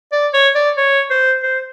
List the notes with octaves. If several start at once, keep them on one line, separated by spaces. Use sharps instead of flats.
D5
C#5
D5
C#5
C5
C5